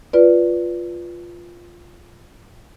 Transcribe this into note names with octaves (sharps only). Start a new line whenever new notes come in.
F4 B4 D5